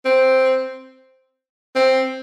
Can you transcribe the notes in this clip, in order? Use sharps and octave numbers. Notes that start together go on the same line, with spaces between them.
C4
C4